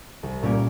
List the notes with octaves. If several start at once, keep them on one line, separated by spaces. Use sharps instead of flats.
C2
A#2 G3 A#3 C#4